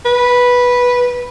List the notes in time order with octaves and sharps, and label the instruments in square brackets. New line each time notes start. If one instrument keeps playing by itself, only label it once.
[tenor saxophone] B4